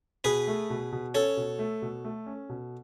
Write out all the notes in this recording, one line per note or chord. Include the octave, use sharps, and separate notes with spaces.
B2 G#4 B4
A3
B2
B2
C#4 A4 C#5
B2
A3
B2
A3
C#4
B2